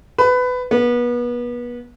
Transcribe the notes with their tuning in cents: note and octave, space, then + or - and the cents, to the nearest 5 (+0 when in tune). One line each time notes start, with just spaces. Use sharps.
B4 +20
B3 -30